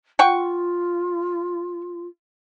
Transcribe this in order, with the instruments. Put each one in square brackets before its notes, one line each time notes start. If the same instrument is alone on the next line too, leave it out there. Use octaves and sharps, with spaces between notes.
[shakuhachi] F4 [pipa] F#5 G5 C#6